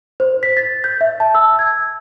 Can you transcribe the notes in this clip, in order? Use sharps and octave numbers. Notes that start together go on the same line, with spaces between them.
C5
B6
A6
G6
E5
A5
E6
G#6